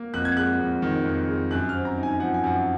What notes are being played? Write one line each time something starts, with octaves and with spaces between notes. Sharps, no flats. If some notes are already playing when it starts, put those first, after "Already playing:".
Already playing: A#3
F2 F#6
G#6
G#3 F#6
F2
D#3
F2
G#3
F#2 F#6
F6
C4
A#5
D#4
G#5
F3 F#5
G#5
F#2 F#5